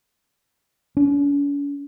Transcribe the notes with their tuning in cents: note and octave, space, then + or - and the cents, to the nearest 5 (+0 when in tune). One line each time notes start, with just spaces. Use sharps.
C#4 +45